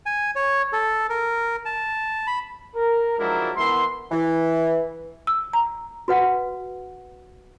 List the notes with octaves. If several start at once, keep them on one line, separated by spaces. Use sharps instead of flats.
G#5
C#5
A4
A#4
A5
B5
A#4
F3 F#3 G#3 D4 E4 A#4
E3 B3 A#4 E5 C6
E3
E6
A#5
F#4 B4 F#5